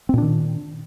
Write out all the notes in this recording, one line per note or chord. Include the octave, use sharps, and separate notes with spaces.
A#2 D#3 C4 D4